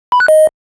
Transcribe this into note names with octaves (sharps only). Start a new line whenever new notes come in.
B5
F#6
D#5